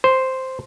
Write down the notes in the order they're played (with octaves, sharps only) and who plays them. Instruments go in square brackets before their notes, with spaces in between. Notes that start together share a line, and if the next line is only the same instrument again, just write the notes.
[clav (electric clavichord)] C5